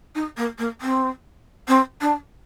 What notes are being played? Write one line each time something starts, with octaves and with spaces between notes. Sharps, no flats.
D#4
A#3
A#3
C4
C4
D4